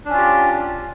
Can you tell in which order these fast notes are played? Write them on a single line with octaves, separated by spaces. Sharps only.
D4 C#4 F4 G4